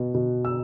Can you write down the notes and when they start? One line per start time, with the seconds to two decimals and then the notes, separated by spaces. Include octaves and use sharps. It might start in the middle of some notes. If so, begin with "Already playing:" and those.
Already playing: B2 B3
0.14 B2
0.45 E6